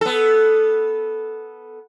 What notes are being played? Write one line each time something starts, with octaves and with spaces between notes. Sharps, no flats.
B3 A4